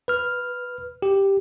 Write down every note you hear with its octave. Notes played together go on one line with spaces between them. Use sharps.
B4 F6
G4